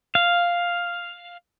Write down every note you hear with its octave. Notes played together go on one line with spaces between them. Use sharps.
F5